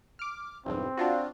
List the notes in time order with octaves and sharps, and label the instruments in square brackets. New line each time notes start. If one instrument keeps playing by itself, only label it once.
[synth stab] D6 F6
[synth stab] B1 E2 G2 [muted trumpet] C4
[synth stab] D4 F4 F#4